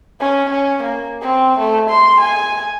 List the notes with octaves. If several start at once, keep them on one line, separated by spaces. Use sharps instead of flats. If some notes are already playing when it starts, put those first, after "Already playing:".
C#4
C#4
A#3
C4
A3
C6
G#5